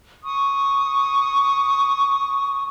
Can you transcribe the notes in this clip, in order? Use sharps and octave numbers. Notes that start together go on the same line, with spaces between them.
C#6 D#6